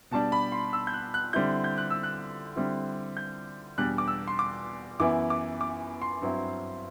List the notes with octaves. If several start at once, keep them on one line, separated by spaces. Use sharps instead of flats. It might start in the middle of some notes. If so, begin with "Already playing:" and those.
B2 G3 D4 A5
B5
C6
E6
G6
F#6
F#6
D3 G3 C4 E4 G6
G6
F#6
E6
F#6
D3 G3 C4 E4
G6
E2 B2 G3 D4 F#6
D6
E6
C6
D6
F#2 E3 B3 E4 D6
D6
D6
C6
G2 F#3 C4 E4